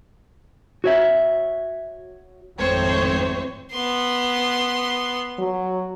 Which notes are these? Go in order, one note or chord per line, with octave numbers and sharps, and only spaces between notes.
F#4 C#5 E5
G#1 F2 A2 C4 C5 C#5
B3 C6
F#3